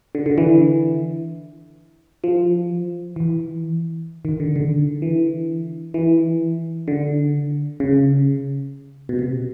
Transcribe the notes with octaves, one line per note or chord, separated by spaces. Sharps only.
D3
D3
E3
F3
E3
D#3
D3
D3
E3
E3
D3
C#3
B2
C3